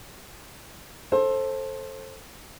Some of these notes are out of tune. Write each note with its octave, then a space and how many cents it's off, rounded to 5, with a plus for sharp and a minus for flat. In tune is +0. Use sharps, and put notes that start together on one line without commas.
A4 +0 C5 +20